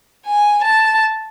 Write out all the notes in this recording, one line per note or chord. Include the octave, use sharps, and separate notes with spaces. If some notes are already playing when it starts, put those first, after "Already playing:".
G#5
A5